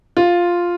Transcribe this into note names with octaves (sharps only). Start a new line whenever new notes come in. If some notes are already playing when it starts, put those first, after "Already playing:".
F4